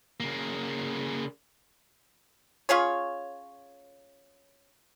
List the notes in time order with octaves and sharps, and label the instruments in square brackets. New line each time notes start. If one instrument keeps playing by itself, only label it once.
[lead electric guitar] C#3 A#3
[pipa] C#4 F4 G#4 C#5